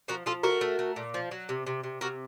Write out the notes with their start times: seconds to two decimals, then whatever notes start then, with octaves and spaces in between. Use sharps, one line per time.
0.08 F3 F#4 A#4
0.26 F3 F4 A4
0.43 A3 F#4 A#4
0.61 A3
0.79 A3
0.96 A#2
1.14 F3
1.31 F#3
1.49 C3
1.67 C3
1.84 C3
2.01 C3 F#4 A#4